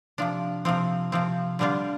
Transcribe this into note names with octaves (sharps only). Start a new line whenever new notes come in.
C3 F3 D4
C3 F3 C4
C3 F3 C4
D3 G3 D4 F4